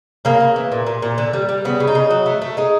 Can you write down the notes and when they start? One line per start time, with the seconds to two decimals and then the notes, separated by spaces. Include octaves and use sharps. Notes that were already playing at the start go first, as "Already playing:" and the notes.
0.25 C#3 A#3
0.40 C#3
0.56 E3
0.72 A#2
0.86 A#2
1.02 A#2
1.18 D3
1.33 G3
1.49 G3
1.65 C#3 B3
1.80 C#3
1.88 D#4
1.95 C#3
2.11 F#3
2.26 A3
2.42 A3
2.57 G#3 D#4